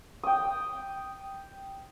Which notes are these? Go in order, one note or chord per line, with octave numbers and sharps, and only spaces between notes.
G5 D#6